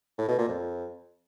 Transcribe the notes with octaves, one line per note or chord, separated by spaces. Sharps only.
A2
B2
A#2
F2